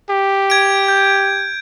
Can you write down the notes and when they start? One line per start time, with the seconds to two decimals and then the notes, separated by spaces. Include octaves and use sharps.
0.10 G4
0.50 G#6 D7
0.88 G6